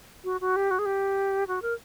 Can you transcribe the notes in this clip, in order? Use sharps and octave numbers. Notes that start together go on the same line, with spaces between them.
F#4
F#4
G4
F#4
G#4
G4
F#4
A#4